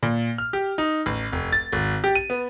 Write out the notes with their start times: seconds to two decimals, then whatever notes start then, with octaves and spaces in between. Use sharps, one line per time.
0.03 A#2
0.38 F6
0.53 G4
0.78 D#4
1.06 A1
1.32 F1
1.52 A6
1.72 G#1
2.04 G4
2.15 D#7
2.30 B3